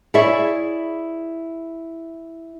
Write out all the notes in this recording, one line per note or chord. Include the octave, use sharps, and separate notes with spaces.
E4 G#4 C#5 D5 E5